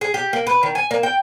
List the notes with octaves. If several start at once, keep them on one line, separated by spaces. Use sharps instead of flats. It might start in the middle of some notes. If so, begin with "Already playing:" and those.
G#4
G4
A#3
B4
D#3
G#5
A#3
G5